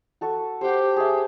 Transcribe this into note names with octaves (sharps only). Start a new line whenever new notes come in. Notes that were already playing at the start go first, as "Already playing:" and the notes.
F#4 A4 C#6
G4 C5 F#5
G#4 E5